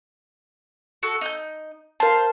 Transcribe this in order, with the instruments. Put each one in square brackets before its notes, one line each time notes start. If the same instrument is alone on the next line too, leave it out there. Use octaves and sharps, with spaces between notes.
[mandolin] F#4 A4
D#4 G6
[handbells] A#4 A5 [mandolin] C5 F5